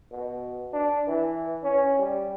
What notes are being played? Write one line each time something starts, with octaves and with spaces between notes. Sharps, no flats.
B2
D4
E3
C#4
G3